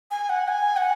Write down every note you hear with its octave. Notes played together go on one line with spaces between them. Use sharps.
G#5
F#5
G#5
F#5